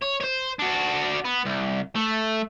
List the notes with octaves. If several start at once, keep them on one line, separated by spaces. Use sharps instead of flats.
C#5
C5 C#5
D4 F#4
B3
C2
A3